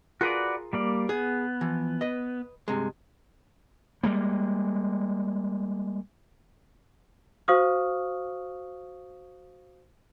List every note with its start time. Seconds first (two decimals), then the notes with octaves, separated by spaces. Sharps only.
0.21 F4 F#4 G#4 A#4 B4 D5
0.73 G3 A#3 D5
1.09 B3 G#4
1.61 E3 F3
2.01 B4 D#5
2.68 G2 C3 G#3
4.03 G3 G#3 A#3
7.48 F#4 C5 F5 C#6 D#6 F6